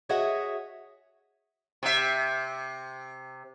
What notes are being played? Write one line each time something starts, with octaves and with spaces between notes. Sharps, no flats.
F#4 G#4 C#5 D#5 E5 F#5
C3 E5